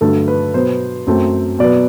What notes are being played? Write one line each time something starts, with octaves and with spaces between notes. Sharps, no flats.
G2 D3 F#3 A3 A4
B4
B2 F#3 B3 C5
F#2 F#3 A3 C4
B2 F#3 B3 D5